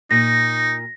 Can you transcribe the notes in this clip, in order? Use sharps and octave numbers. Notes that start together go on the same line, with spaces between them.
A#2 D#4 A#6